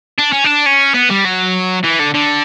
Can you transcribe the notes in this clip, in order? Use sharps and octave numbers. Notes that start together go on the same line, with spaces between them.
D4
C#4
D4
C#4
B3
G3
F#3
E3
D3
D3